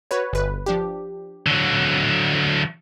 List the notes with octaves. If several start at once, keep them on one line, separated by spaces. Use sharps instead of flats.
F#4 B4 C#5
G1 B4
F3 D4 G4
D3 F#3